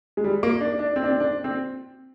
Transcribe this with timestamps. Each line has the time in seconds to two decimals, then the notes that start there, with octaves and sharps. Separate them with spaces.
0.17 G#3
0.24 G3
0.43 A#3
0.61 D4
0.79 D4
0.96 C4
1.04 D4
1.11 C4
1.20 D4
1.44 C4